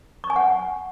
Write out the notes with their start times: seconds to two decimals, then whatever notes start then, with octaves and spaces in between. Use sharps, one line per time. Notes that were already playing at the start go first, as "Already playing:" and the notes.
0.24 C#6
0.30 G#5
0.36 F#5